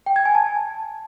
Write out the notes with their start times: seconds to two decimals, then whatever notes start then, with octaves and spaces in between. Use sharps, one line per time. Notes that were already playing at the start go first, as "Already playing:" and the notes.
0.06 G5
0.16 G#6
0.25 G#5
0.35 A5